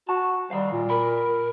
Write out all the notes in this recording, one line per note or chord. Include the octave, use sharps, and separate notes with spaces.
F#4 A5
D#3 G3 F5
A#2
A#4 B5